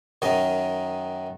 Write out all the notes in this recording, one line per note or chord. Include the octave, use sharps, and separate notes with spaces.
F#2 D#3 D#5